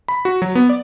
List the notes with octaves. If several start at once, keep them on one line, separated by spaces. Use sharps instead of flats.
B5
F#4
F#3
B3
D5